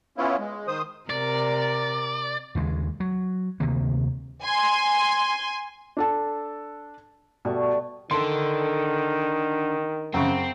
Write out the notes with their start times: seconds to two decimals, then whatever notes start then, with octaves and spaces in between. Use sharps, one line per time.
0.17 B3 C#4 E4 F4
0.39 G#3
0.68 D#3 C5 D#6
1.10 C3 A#4 D5
2.55 D#2 C#3 G#3
3.00 F#3
3.60 D2 C3 D#3 A#3
4.43 G#5 C6
5.97 D4 A4 A5
7.45 B2 G3 A3 C#6
8.11 D3 D#3 A4 C6
10.14 F#2 C#3 C4